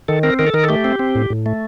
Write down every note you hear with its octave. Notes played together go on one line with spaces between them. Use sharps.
D#3 A4
C4 A#4
D#3 A#4
A4
D#3 A#4
A4
A3 G4
C4
C4
A2
A2
A3